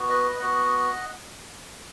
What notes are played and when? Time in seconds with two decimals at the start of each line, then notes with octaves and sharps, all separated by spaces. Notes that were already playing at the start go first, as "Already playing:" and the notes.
Already playing: B3 F#4
0.09 B4 D#5
0.39 B3 F#4 D#5 F#5